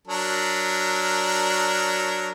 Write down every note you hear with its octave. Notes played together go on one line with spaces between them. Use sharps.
F#3 D4 A#4